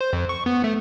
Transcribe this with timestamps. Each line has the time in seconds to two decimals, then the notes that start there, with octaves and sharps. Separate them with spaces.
0.01 C5
0.13 F2
0.29 C#6
0.46 B3
0.64 A3